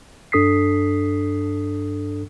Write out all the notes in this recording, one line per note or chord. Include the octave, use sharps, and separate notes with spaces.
G2 D4 A4 D#6 B6 C7